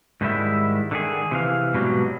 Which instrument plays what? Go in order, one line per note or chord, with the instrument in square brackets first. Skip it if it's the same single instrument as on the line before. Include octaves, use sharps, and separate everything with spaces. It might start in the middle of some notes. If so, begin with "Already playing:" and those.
[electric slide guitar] G#2 D#3 G3 G#3 E4 E5
D3 D#3 G#4
C3 E3 F5
G#2 B2 F#3 G3